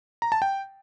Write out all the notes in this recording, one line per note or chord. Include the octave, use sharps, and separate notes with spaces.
A#5
A5
G5